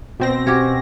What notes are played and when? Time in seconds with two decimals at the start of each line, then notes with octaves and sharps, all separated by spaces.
0.20 B2 C4 A#6
0.47 C#4 F#4 G4